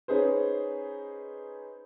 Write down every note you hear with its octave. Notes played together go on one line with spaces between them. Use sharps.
C#4 D#4 G#4 B4 C5